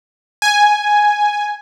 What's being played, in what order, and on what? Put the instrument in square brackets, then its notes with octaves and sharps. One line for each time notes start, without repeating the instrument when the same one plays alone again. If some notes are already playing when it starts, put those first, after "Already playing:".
[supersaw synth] G#5